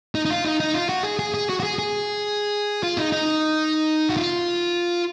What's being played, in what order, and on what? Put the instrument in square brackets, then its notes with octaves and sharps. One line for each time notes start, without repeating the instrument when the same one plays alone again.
[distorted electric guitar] D#4
D#4
F4
D#4
D#4
F4
F#4
G#4
G#4
G#4
F#4
F#4
G#4
G#4
F4
D#4
D#4
F#4
F4